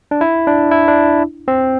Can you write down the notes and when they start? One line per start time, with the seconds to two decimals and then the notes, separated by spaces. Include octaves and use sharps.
0.11 D4
0.21 E4
0.47 D4
0.71 E4
0.88 D4
1.48 C4